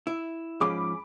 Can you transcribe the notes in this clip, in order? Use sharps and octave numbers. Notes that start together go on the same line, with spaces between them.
E4
G#2 F3 C#4 G#4 B5 D6